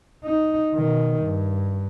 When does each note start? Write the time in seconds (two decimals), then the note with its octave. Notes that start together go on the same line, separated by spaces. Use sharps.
0.25 D#4
0.75 B2 D#3
1.22 G2